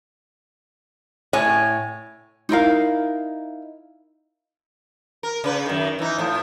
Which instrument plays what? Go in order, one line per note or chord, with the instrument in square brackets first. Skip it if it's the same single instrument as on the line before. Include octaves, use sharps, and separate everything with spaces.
[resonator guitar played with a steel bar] A2 C#5 G#5
[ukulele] D#4 E4 A#4 F5
[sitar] A#4
C#3 B4
F#2 D#3
E3 D#4
A2 F3